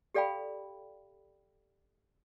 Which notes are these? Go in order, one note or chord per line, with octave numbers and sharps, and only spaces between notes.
G4 A4 D5 F5 G5 B5